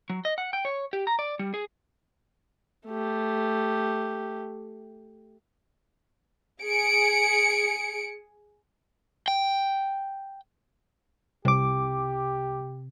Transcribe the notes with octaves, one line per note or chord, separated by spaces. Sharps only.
F#3
D#5
F#5
G5
C#5
G4
A#5
D5
G3
G#4
A3 G4
G#4 C#7 D7
G5
C2 C3 G4 D6